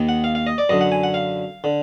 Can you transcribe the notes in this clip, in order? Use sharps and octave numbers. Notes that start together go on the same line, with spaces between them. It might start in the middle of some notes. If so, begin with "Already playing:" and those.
Already playing: D#2 D#3
F#5
F5
F5
D#5
D5
F#2 D3 D#5
F#5
G#5
F#5
F5
D3